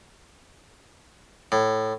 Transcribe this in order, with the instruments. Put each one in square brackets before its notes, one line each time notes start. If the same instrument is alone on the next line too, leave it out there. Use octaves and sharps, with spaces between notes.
[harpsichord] A2